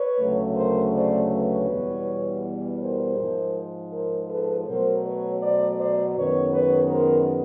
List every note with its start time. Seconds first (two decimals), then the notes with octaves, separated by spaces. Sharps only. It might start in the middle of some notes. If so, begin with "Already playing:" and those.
Already playing: B4 C#5
0.19 D2 C#3 F#3 A3
0.56 A#4 C5
0.94 C5 D5
1.32 B4 C#5
1.69 E2 B2 G3 B3
2.81 A#4 C5
3.18 G#2 F3 G#3
3.93 A#4 C5
4.30 A4 B4
4.67 B2 F#3 A3 A#4 C5
5.04 B4 C#5
5.42 C5 D5
5.80 C5 D5
6.17 F#2 D#3 G#3 B3 B4 C#5
6.54 B4 C#5
6.91 A#4 C5